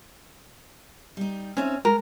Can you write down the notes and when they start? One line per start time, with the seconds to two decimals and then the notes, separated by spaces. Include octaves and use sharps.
1.17 G3 D#4
1.57 C4 C#4 D#4 E5
1.85 G#3 A#4